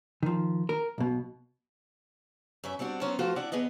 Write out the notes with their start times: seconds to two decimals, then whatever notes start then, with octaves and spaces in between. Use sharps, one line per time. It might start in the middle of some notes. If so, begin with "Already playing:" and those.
0.23 D#3 F3
0.69 A#4
0.98 B1 B2
2.64 F#2 C#4 E5
2.79 G3 C4 D4 F#4
3.01 F#3 B3 C#4 C5
3.19 F3 A3 F4 F#4 C5
3.36 C4 D4 E4 D5 F#5
3.52 E2 B3 G#4 B4 D#5